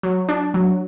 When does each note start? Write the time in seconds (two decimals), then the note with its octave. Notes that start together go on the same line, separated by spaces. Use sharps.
0.03 F#3
0.29 D4
0.54 F#3